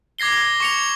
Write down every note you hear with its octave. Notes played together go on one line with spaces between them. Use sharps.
D6 G#6 A#6 C7 G7
C#6 C#7 F7